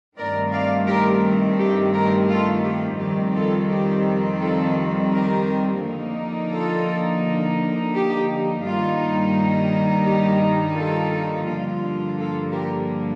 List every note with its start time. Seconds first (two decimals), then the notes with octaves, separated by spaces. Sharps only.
0.18 G2 D#3 A3 C4 A#4 D5
0.53 D5 F5
0.88 G4 A#4
1.58 G4
1.94 G4 A#4
2.29 F4 A4
2.64 G4
2.99 F2 D#3 G3 C4 G4
3.35 F4 A4
3.70 G4
4.41 F4 A4
5.12 G4 A#4
5.82 D3 F3 A#3 D#4
6.52 F4 A4
7.94 G4
8.64 G2 D#3 G3 A#3 D#4 F4
10.06 G4
10.77 F4 A4
11.47 G2 D3 F3 A#3 F4
12.17 F4 A4
12.52 G4 A#4